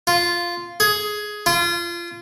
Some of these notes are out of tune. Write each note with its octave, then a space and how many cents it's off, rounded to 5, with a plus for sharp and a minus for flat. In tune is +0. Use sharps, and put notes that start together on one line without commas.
F4 -5
G#4 +10
F4 -25